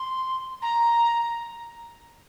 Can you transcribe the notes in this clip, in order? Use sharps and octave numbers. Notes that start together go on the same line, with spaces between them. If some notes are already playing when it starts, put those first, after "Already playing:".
Already playing: C6
A#5